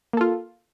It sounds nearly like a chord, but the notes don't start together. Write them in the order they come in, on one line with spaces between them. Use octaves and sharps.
A#3 A4 F4